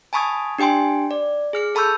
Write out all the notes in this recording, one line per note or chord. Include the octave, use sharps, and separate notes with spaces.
G#5 A5 B5 C#6 D#6 G#6
D4 G4 G5 G#5 C6
D5
G#4 F6 C#7
A4 A5 B5 C#6 E6 G6